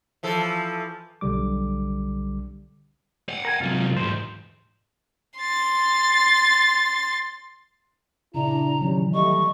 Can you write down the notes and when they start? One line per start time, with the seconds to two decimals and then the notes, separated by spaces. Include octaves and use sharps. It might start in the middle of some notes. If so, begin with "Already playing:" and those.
0.23 E3 F3 A4
1.21 B1 D3 G3 D6
3.29 F5 F#5
3.45 A#4 G#5
3.61 C3 F#3 F4
3.96 E2 G#2 C5
5.40 C6 A6
8.34 A#2 C#3 D4 E4 A#5
8.81 D#3 E3 F#3 G3 C#4
9.14 G3 A3 D#5 C#6